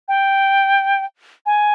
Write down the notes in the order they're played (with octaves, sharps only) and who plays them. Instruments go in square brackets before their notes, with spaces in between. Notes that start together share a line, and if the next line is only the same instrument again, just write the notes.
[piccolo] G5
G#5